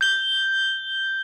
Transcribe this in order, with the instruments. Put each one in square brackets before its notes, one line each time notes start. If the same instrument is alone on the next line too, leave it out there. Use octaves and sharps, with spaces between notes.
[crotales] G6 G7